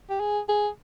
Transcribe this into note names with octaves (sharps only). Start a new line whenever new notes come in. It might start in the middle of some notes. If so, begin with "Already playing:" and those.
G4
G#4
G#4